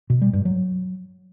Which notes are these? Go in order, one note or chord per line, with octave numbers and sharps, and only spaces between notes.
B2
G3
G2
F#3